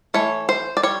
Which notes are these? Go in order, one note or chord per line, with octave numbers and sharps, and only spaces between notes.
E3 A3 C#5
C5
D5
G3 C#5